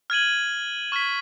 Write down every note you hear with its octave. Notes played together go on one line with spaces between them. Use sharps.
F6 G#6 D#7 F#7
C#6 F6 G#6 B6